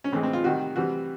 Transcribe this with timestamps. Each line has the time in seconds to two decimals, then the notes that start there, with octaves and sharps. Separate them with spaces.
0.04 C#4
0.12 A2 E3 G#3 C4
0.23 C4
0.33 F4
0.44 C3 D#3 G3 F#4
0.76 C3 E3 G3 F#4